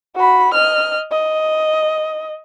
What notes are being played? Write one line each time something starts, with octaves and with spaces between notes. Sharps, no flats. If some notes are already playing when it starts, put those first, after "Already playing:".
F#4 B5
D#5 F6
D#5